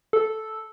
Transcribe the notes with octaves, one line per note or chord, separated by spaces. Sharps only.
A4